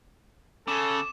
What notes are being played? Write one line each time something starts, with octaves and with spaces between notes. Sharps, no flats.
C#3 A4 D6 E7